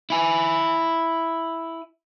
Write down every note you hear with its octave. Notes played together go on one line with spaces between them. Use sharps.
E4 G#5